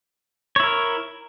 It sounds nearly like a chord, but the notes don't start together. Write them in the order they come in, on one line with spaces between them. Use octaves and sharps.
C#5 E4 A#4